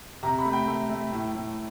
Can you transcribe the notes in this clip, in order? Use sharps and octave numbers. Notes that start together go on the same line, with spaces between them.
C3 A#5
B5
A3
G5
A3
A3
A2
A2